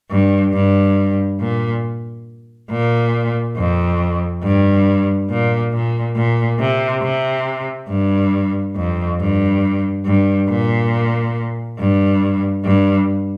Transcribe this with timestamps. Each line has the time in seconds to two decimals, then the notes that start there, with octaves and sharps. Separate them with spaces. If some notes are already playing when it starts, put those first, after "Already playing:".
0.11 G2
0.54 G2
1.40 A#2
2.71 A#2
3.57 F2
4.43 G2
5.30 A#2
5.73 A#2
6.16 A#2
6.60 C3
7.03 C3
7.90 G2
8.76 F2
9.20 G2
10.06 G2
10.49 A#2
11.79 G2
12.65 G2